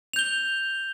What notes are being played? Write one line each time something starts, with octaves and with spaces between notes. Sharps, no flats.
G6 F7 G7